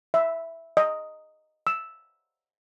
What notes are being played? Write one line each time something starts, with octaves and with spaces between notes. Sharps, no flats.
E5
D#5
E6